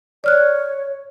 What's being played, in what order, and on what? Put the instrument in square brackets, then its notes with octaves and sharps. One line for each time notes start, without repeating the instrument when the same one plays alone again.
[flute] C#5 [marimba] D5 F6 F#6